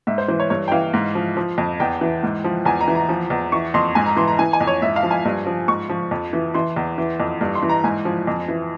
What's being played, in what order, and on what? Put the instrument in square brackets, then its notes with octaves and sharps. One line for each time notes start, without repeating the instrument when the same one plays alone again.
[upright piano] G#2 E5
C5
E3 C5
C#5
G2 C#5
G5
E3 F5
G#2
F3
F3
F2
E2 G5
E3
G#2
F3
E2 G#5
A#5
E3
A#5
F3
E2
E3 C#6
F2 C6
G#2 G#5
A#5
E3 C6
A#5
E3 G#5
G#5
F2
C#5
G#2 E5
F5
F3
G#5
G2
F3
G#2 C#6
F3
F2
E3
E3 C6
E2
E3
F2
G2
C6
E3
A#5
G#2 G#5
F3
F2
E3